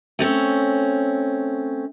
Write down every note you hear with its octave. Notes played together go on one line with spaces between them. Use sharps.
A3 C4 C#4